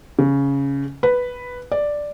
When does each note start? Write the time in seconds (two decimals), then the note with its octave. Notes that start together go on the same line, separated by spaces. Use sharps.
0.19 C#3
1.03 B4
1.72 D5